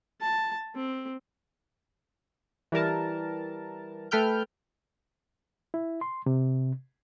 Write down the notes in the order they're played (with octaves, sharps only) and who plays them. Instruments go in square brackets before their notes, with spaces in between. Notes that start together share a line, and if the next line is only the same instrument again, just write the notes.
[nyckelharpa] A5
C4
[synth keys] E3 G3 A#4 A5
A3 A4 B4 G5 F6 G6
[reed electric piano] E4
C6
C3